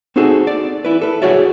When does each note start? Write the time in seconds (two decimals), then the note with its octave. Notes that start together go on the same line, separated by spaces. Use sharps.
0.16 C4 D#4 F#4 G#4 A4
0.47 D5
0.85 E4 B4
1.02 A4 B4
1.22 F#4 G#4 C#5 D5 E5